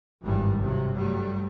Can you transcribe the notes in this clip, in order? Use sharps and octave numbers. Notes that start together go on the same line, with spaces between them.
G#1 G2 E3 G3
G2 C3 F#3
G2 F#3 G3 A3